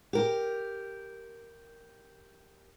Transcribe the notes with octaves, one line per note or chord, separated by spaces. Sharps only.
G4 A#4